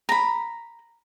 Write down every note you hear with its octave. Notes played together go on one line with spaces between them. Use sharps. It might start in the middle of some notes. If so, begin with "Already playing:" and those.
A#5 B5